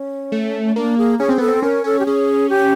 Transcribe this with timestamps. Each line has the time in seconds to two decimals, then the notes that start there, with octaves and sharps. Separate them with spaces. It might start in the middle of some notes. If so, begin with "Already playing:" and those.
Already playing: C#4
0.32 A3
0.76 A#3 D4
0.98 G#4
1.19 C#4 G#4
1.29 C4
1.38 B3 A4
1.48 C4
1.62 C#4 A#4
1.84 C#4 A4
1.99 G4
2.06 C#4 G#4
2.49 G4